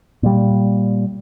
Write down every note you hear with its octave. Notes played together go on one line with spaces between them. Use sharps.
A#2 G3